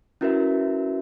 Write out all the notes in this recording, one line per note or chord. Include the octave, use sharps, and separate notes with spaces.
C#4 E4 F#4 A#4 B4 E5